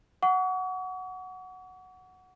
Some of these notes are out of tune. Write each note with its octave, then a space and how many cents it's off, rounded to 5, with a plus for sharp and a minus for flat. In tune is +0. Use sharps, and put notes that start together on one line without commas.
F#5 +0 C#6 +40